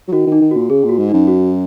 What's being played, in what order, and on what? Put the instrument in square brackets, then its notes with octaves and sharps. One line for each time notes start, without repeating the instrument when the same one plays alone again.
[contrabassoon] F#3
[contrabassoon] D#3 [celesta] F#4
[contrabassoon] D#3
[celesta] D#4
[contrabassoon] D#3
[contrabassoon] A#2 [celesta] F#4
[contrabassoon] C#3 [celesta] G#4
[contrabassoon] A#2
[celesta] F#4
[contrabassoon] G#2
[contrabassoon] F#2 [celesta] D#4
[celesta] F#4